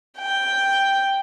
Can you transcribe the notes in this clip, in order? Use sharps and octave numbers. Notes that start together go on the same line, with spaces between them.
G5